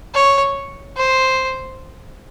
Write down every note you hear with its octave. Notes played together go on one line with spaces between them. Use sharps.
C#5
C5